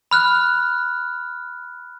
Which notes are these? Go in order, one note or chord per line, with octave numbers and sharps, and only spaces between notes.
B5 F6 F#6